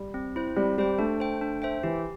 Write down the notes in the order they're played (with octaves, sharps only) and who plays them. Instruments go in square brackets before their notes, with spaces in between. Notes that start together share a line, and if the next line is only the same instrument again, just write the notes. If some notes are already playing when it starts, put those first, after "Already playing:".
Already playing: [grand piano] G3
[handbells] C4
E4 C5
[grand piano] G3 [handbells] C4
[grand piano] G3 [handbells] G4 C5 G5
[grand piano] A3 [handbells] D4
[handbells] C5 G5
D4
C5 E5 G5
[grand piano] E3 [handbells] G4